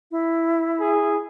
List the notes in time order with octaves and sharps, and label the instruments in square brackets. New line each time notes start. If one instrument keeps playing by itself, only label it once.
[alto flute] E4
[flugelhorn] G#4